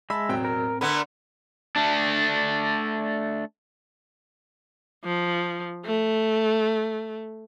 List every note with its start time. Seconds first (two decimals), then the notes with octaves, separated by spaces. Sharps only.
0.10 G#3 E5 A5 B5
0.29 E1 A2 F#3 C4 G5
0.45 A#4
0.81 D3 A3 B3 A#4 B5
1.76 A3 D4
5.05 F3
5.86 A3